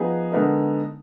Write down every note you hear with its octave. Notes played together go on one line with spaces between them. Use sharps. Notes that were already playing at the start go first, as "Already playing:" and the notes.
Already playing: F3 B3 D#4 G#4 B4
D3 G#3 B3 D#4 A#4